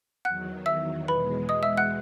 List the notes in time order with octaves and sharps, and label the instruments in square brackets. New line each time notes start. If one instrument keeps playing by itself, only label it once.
[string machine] E2 D#3 F#3 [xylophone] F#5 F#6
[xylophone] E5 E6
[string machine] E2 B2 G#3 [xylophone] B4 B5
[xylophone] D#5 D#6
E5 E6
F#5 F#6